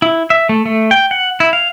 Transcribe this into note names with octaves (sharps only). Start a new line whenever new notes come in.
E4
E5
A3
A3
G5
F#5
E4
F5